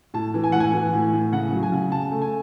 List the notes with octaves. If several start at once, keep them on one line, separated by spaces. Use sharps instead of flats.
A2 A5
E3
G#5
A2 F#5
G#5
E3
A2
A2
C#3 F#5
F#3
G#5
C#3
C#3 A5
A3
G#5